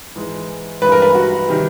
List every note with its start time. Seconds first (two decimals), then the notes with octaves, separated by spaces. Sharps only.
0.16 G#2 E3 G#3
0.82 G2 E3 G#3 B4
0.92 A#4
1.02 B4
1.15 F#4
1.48 C3 D#3 G3